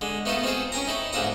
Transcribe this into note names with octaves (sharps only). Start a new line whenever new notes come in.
D3 G#3
A3 B3 D#4 F4 A4
C4 F4 G#4 A4
C#4 G5 G#5 A#5
D#4 E4 A4
D2 G#2 D4 F4 A4 A#5